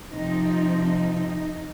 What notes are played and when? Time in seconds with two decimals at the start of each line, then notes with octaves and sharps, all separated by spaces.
0.12 C3 F3 C4 D#4
0.46 F4
0.82 D#4